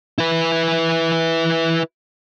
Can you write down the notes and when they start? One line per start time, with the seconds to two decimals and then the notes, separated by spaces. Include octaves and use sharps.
0.18 E4 B4